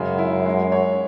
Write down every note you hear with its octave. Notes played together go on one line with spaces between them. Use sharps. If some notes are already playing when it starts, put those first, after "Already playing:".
Already playing: F#2 C#3 G#3
E4
G#3
C#5